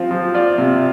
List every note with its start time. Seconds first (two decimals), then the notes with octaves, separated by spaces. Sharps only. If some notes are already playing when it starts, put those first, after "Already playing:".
Already playing: F3 C4 F4
0.11 F3
0.34 F4 D5
0.58 C3